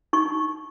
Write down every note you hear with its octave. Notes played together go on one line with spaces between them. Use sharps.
D#4 C#6